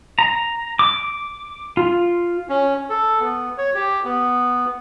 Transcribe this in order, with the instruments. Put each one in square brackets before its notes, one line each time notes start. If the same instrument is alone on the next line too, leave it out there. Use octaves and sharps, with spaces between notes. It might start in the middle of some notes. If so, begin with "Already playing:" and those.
[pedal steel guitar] A#5
D6
F4
[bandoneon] C#4
A4
B3
C#5
G4
B3